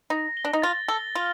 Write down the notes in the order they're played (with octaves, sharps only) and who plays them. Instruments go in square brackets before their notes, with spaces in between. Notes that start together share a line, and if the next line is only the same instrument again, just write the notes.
[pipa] D#4 [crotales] A#6
[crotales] G7
[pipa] D4
D#4
[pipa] F4 [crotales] A6
[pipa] A4 [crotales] G7
[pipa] F4 [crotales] F6